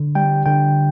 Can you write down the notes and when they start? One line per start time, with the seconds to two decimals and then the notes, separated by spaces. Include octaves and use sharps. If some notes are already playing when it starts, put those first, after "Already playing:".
Already playing: D3
0.15 G3 G5
0.46 D3 G5